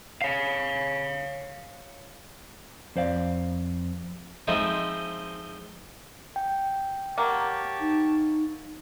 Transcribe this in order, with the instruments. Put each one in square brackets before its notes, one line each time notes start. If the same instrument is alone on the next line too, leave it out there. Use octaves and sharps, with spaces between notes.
[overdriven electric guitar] C#5 F5
[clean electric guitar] F2 C5 D5 F5
[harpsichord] F3 G#3 C4 D#4 E4
[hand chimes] G5
[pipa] F#3 A#3 [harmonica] G4 A5 C#6
[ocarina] D#4